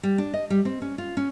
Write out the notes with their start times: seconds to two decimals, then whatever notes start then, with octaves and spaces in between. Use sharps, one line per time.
0.03 G3
0.18 D4
0.33 D#5
0.50 G3
0.65 C4
0.82 C#4
0.98 F4
1.17 C#4